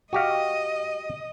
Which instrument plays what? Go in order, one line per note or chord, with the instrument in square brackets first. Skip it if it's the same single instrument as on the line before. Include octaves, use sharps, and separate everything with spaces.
[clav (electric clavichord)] F#4 G4 F5 [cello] D#5